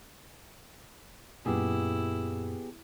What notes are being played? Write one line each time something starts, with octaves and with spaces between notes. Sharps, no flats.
F#2 A#2 B3 E4 G4 G#4